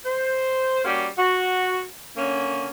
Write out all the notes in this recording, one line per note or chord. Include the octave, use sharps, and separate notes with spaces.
C5
G3 A#3 C#4 F#4 G4
F#4
D3 A#3 C#4